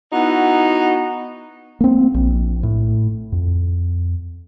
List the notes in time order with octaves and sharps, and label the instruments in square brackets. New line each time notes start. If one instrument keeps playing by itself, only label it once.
[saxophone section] B3 D#4 E4 F#4
[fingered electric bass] A#3 C4
A#1
A2
F2